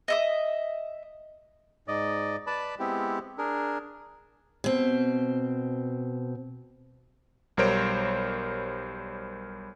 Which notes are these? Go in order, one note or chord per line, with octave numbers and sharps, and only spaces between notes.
D#5 E5 D#6
G#2 D5 D#5
B4 D5 A5 B5
G#3 B3 C4 E4 G4
D4 G#4 A#4
B2 C4
B1 G3 A#4 C5 C#5 D7